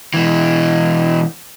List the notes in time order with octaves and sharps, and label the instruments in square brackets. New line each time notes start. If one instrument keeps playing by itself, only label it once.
[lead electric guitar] B2 E3